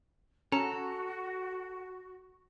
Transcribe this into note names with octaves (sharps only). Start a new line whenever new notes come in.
C#4 F#4 A4 A#5